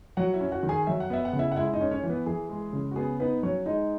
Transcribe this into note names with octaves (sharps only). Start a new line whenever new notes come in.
F#3 F#4 F#5
E4 E5
C#4
F#4 F#5
D#3
G#4 G#5
F#3 E5
F#5
B3 E5
F#5
C#3
E4 E5
F#5
G#3 E4 E5
D#4 D#5
C#4
C#4 C#5
E3
B3 B4
E3 G#4
G#3
C#3
F#4
B3 G#4
B3 D#4 B4
F#3 C#4 C#5
G#3 D#4 D#5